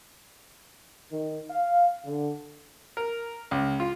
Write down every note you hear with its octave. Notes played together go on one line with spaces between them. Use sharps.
D#3
F5
D3
A#4
C#2
F4